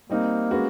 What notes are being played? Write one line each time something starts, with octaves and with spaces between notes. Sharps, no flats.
G3 A#3 C4 D#4
G#3 C#4 F#4 B4